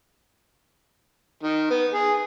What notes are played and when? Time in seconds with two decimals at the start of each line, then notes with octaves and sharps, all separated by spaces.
1.43 D#3
1.70 B3
1.93 G#4